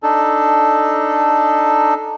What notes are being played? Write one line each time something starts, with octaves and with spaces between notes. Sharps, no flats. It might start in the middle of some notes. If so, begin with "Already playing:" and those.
D4 D#4 A4